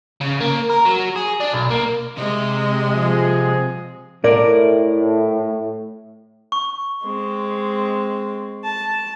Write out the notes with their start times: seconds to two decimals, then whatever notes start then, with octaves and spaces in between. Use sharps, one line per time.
0.21 C#3
0.40 A#3
0.70 A#4
0.85 F#3
1.16 G#4
1.40 D4
1.53 B1
1.71 A#3
2.17 C3 G#3 D#5
2.94 F3 G#4
4.24 A2 A#4 D5
6.52 C#6
7.03 G#3 C4
8.64 A5